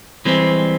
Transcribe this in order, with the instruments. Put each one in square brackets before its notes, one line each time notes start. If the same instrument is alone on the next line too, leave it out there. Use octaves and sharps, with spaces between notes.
[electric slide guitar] E3 G#3 C4 [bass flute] G3